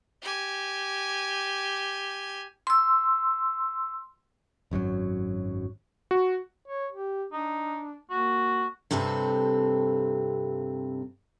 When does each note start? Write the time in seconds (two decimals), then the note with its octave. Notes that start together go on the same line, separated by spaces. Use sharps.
0.22 G4 G#5
2.67 C6 E6
4.71 G#1 F#2 A2 F#3
6.11 F#4
6.68 C#5
6.92 G4
7.33 D4 D#4
8.10 A#3 F#4
8.91 G2 C3 C4 A4 B4